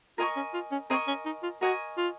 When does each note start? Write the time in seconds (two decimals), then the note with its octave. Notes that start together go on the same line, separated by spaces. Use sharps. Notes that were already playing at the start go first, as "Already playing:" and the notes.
0.18 F4 A#4 D#5 G#5 C#6
0.36 C#4
0.54 F4
0.72 C#4
0.90 C4 A#4 D#5 G#5 C#6
1.07 C#4
1.25 D#4
1.43 F4
1.61 F#4 A#4 D#5 G#5 C#6
1.97 F4